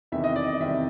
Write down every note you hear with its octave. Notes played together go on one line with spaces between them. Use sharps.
E2 C3 D#3 E5
D#5
D5
D#5
E2 C3 D#3 E5